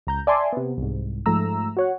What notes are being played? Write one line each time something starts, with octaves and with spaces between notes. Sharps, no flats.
C#2 A#5 G6
D5 E5 G#5 A5 C6 D6
C3 B3
C2 G#2
G#2 F3 A3 A#5 E6
F#4 C#5 F#5